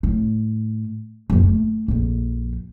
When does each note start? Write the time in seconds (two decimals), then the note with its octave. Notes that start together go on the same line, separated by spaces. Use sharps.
0.03 A2
1.30 D#1 F#2
1.43 A3
1.88 A#1 F2